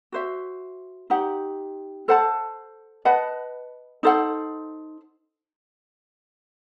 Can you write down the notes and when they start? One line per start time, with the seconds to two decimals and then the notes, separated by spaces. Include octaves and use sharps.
0.12 F#4 C5 E5
1.10 D#4 G4 C5 F#5
2.08 A4 C5 F#5 A5
3.05 B4 D#5 F#5 A5
4.03 D#4 A4 C5 F#5